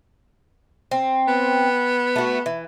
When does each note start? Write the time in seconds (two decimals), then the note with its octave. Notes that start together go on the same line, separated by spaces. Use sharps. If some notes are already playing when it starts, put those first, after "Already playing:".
0.91 C4
1.28 B3
2.16 A3 F#4
2.46 E3